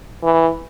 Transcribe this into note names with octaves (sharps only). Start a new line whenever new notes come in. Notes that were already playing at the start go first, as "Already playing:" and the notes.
E3